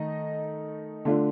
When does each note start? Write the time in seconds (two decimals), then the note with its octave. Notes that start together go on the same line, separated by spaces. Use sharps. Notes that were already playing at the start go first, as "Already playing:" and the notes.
Already playing: D#3 A3 D#4 D#5
1.05 D3 A3 D4 F4